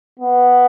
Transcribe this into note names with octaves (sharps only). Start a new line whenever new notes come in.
B3